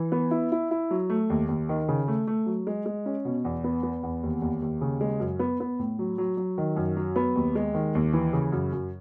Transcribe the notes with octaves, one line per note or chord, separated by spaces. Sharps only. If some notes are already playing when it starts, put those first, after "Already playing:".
Already playing: E3
B3
E4
E4
E4
F#3
A3
D#2
D#2
D#3
C#3
A3
A3
F#3
G#3
G#3
C#4
B2
E2
B3
B3
E2
D#2
D#2
D#2
C#3
G#3
F#2
B3
B3
A2
F#3
F#3
F#3
D#3
F#2
F#3
B3
D#2
G#3
D#3
D#2
E3
C#3
F#2
F#2